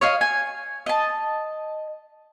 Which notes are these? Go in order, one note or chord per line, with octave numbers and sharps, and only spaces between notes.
C#5 D#5 F5
G#5
D#5 A5